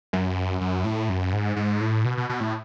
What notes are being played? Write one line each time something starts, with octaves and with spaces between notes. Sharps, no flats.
F#2
F#2
A2
F#2
G#2
G#2
A2
B2
B2
B2
A2